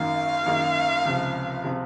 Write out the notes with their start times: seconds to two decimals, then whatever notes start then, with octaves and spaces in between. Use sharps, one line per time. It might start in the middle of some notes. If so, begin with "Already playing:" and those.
Already playing: G#1 F#2 D#3 A#3 F5
0.45 G#1 F#2 D#3 A#3
1.05 C#2 C3 F3
1.64 C3 F3